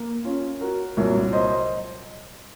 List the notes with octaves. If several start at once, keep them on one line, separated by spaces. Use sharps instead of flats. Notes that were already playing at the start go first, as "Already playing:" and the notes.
Already playing: A#3
C#4 F4
F#4 A#4
C2 A#2 F#3 A#4 C#5
C5 D#5